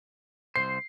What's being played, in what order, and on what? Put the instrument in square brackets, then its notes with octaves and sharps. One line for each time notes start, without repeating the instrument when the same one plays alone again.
[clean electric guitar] C2 C3 C5 [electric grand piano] C7